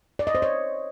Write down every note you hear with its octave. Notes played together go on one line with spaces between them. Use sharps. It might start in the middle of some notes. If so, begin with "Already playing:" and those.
D5
D#5
C5
C#5